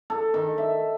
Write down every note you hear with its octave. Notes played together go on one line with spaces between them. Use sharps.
A4
D#3
E5